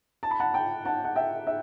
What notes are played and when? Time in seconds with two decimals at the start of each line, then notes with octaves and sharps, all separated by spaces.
0.23 A5
0.31 B5
0.40 F#5 A5
0.53 G5 B5
0.85 F#5 A5
1.05 F#5
1.16 E5 G5
1.47 E5